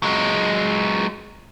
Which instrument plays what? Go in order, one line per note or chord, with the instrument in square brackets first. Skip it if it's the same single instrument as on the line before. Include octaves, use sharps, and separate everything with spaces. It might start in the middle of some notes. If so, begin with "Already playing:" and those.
[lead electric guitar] F#3 G#3